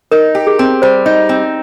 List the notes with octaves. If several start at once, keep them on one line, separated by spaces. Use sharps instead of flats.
D#4 A#4
G4
G#4
C4
G3 C5
D#4
C4